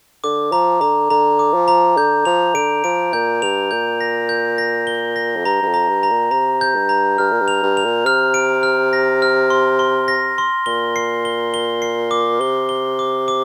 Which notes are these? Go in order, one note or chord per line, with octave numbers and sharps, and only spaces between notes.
D3 D6
F3 A#5
D3 A#5
D3 A#5
D6
F3
A#5
D3 G6
F3 F7
D3 D7
F3 D7
A#2 G6
G2 F7
A#2 G6
A#6
G6
A#6
G7
A#6
F2
G2 A#5
G2
F2
A#5
G2
A#5
A#2
C3 A#5
G6
G2
A#5
G2 F6
A#2
G2
F7
G2
F7
A#2
C3 F6
D7
F6
A#6
F6
C6
C6
A#6
C6
A#2 G7
C7
G7
G7
C7
D6
C3 G7
G7
D6
D6